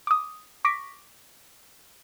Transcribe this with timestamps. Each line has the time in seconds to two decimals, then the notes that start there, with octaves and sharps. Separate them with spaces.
0.07 D6 D#6
0.65 C#6 D6 A#6 B6 D7